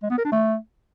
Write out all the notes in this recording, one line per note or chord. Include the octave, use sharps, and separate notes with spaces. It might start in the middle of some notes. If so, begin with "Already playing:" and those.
G#3
B3
A#4
D4
A3